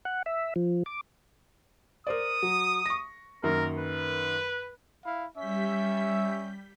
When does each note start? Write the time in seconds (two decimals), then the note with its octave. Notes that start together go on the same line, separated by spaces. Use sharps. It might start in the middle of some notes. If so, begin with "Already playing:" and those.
0.05 F#5
0.26 E5
0.56 F3
0.86 D6
2.07 A#4 C5 D5 D#6
2.43 F#3
2.86 C#6 A#6
3.43 F#2 D#3 A#3 A#4
3.78 B4
5.05 E4 F5
5.36 G3 C#4 E5 G6 B6